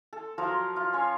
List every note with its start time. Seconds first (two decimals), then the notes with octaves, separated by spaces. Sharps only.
0.13 A4
0.38 F3 F#3 A#4
0.76 F4
0.93 C#4 C#5